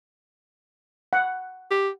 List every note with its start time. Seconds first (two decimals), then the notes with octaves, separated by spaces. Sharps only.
1.13 F#5
1.71 G4